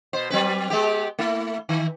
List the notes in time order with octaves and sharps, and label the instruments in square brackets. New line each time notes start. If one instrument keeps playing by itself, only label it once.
[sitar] B2 C5
F#3 C4 B4
G#3 B3 G4
A3 E4
D#3